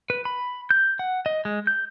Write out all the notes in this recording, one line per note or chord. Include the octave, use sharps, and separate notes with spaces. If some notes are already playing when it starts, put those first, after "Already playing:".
B4
B5
G6
F#5
D#5
G#3
G6